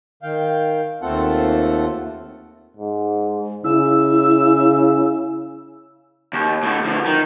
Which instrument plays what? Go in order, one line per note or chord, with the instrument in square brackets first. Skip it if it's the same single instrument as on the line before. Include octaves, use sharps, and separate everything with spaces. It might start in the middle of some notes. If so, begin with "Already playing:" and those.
[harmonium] D#3 F5 G5
D#2 A3 C4 F4 A4 F#5
[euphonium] G#2
[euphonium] C#3 [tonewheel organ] E4 [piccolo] E6
[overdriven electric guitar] D#2
A2 D3
D3 F3
D#3